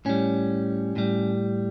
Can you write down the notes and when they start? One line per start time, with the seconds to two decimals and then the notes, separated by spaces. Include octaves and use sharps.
0.05 A2 G3 C#4
0.96 A2 G3